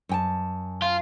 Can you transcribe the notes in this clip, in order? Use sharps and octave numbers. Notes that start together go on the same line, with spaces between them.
F#2 G5 A5
F4